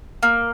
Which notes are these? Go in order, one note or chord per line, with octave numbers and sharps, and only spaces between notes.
A#3